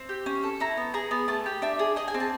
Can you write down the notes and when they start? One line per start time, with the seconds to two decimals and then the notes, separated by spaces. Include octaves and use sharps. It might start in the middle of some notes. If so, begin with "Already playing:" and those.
Already playing: C4
0.09 G4
0.26 C#4
0.43 A4
0.60 E4 A#5
0.77 B3
0.94 G#4 A#5
1.11 B3
1.28 A3 A5
1.46 G4
1.62 D4 E5
1.79 G#4
1.96 G#4 D#5
2.08 G#5
2.14 C4
2.20 A5